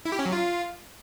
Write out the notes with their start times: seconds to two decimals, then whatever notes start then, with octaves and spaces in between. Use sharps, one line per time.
0.05 E4
0.12 G4
0.19 C#4
0.26 F#3
0.32 F4